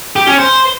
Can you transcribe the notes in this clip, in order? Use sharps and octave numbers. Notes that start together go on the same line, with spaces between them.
G4
C#4
C5